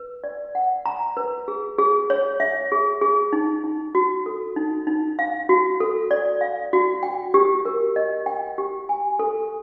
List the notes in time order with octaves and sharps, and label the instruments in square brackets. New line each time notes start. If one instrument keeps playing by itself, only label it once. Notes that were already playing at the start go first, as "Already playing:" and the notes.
Already playing: [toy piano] B4
D5
F#5
A#5
B4
G#4
G#4
C#5
E5
G#4
G#4
D#4
D#4
F#4
A4
D#4
D#4
F5
F#4
A4
D5
F5
F#4
G5
G4
A#4
D#5
G5
G4
G#5
A4